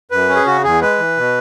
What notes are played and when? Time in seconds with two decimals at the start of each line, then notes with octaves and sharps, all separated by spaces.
0.11 F#2 B4
0.29 C#4
0.35 G#4
0.46 C#3 F#4
0.64 E2 G#4
0.81 G#3 B4
0.99 E3
1.17 B2